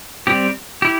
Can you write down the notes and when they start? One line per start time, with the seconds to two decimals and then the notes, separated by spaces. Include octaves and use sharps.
0.27 G3 C4 G4
0.82 E4 G4